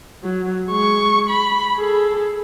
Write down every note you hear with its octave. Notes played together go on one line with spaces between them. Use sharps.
F#3
G#3 C#6
B5
G#4 A4